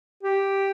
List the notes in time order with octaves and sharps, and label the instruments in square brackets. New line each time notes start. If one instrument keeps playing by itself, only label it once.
[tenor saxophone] G4